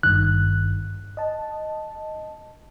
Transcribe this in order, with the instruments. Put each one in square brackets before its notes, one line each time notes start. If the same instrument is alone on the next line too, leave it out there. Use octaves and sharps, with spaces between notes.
[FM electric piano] G#1 G2 D#3 [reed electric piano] F#6
[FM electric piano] D#5 A5